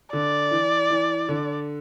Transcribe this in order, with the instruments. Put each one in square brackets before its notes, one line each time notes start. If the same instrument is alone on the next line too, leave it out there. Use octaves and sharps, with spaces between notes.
[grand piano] D3 [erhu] D5
[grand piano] E3
E3
D3